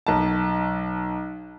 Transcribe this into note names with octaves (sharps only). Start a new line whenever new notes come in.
B1 A5